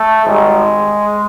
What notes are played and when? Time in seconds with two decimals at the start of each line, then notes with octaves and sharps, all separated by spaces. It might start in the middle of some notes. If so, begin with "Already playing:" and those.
Already playing: A3
0.24 G#1 G#2 D#3 G3 G#3